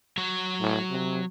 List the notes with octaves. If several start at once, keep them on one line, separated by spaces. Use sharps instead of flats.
F#3 C#5
A2
C3